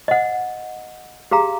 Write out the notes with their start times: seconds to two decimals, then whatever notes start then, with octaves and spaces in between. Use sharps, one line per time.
0.08 D#5 F#5
1.31 G4 G#4 F5 A#5